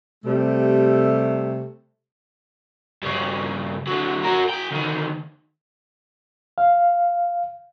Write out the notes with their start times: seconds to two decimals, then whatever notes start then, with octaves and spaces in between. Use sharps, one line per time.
0.25 C3 G3 A3
3.02 G2 C#3
3.87 D3 F#3
4.25 F#4 A#4
4.50 G#4 G5
4.71 D2 D#3
6.58 F5